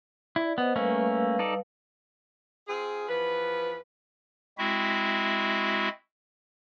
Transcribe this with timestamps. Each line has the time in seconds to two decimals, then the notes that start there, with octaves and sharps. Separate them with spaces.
0.36 E4 D5
0.58 B3 C5 D#5
0.76 G3 A3 A#3 C#4 B4 F5
1.39 D#4 A4 D5
2.67 C4 F4 G#4
3.09 E2 F3 B4
4.58 G#3 C4 E4 F#4 E5